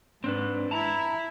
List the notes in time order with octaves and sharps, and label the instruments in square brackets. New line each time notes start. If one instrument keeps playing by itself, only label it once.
[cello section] G#2 [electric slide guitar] C4 D4 B4
[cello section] E4 [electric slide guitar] A5 A#5